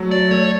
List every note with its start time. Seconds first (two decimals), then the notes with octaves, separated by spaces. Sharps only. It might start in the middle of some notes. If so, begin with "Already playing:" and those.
Already playing: F#3 A3
0.11 D5
0.31 A3 C#5